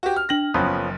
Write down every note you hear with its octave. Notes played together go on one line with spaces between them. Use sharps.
F#4 G4
F6
D4 G5 F6 A#6 F#7
F#1 F#2 F3 F#3 B3 G5 B5 D#6